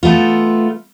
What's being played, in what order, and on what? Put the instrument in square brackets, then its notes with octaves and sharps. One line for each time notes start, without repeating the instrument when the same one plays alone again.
[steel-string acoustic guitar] A3 B3 F4